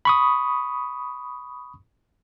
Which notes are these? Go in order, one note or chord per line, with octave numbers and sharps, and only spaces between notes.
B5 C#6 D#6